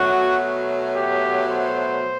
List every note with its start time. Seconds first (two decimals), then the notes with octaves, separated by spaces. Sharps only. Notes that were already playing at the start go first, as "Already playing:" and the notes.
Already playing: B2 F#3 A3 F#4
0.95 G4
1.50 C5